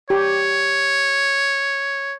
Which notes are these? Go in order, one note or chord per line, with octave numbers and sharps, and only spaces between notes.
G4 C#5